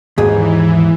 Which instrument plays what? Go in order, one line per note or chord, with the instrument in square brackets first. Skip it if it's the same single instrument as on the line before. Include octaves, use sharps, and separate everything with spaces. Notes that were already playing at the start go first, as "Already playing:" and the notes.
[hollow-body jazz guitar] D#2 G#2 [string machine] E3 [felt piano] G#4